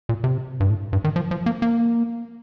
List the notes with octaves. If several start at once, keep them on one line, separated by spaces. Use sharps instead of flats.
A#2
C3
G2
A2
G2
D#3
F3
F3
A#3
A#3